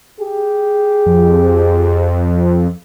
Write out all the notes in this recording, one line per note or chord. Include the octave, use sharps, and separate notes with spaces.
G4 G#4
F2